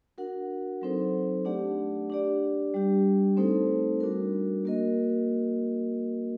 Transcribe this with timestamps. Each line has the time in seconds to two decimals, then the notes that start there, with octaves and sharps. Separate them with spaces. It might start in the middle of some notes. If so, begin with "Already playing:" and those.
0.18 D4 F#4 A#4 F#5
0.81 F#3 C4 D#4 A4 C5
1.45 A3 D4 G4 D5 F#5
2.10 D4 G4 D5
2.74 G3 D4 G4
3.37 A3 C4 D#4 A4 C5
4.00 G3 D4 F#4 A#4
4.65 A#3 F#4 A#4 D#5